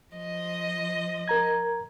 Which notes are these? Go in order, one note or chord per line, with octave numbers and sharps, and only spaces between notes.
F3 D#5
A#4 A#5 G#6